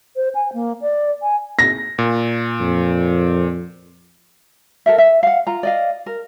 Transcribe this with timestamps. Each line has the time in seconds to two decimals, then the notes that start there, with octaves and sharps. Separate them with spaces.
0.16 C5
0.35 G#5
0.53 A#3
0.82 D5
1.23 G#5
1.59 A#6
1.99 A#2
2.60 F2
4.86 A4 A#4 E5
4.98 E5
5.23 F5 F#5
5.47 F4 A#5
5.63 D5 D#5 F5
6.06 A#4